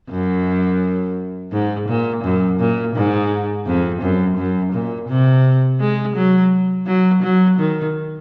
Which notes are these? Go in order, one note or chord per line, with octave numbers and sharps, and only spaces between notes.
F#2
G#2
A#2
F#2
A#2
G#2
F2
F#2
F#2
A#2
C3
G#3
F#3
F#3
F#3
D#3